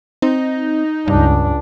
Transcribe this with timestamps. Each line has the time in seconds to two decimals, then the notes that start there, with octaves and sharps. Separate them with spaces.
0.22 C4 D#4
1.08 C#2 G2 D4